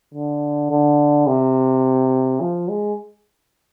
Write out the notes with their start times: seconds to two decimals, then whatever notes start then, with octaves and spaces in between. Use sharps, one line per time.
0.14 D3
0.71 D3
1.27 C3
2.41 F3
2.69 G#3